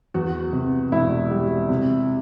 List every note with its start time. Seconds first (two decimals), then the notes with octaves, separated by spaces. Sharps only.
0.14 E2 F#4
0.53 C3
0.92 E1 E4
1.31 G3
1.69 C3